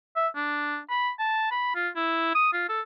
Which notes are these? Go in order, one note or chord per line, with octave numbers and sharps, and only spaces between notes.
E5
D4
B5
A5
B5
F4
E4
D#6
F4
A4